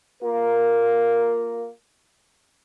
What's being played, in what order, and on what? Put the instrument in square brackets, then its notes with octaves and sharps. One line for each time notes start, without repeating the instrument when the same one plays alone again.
[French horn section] A#3 F4 A#4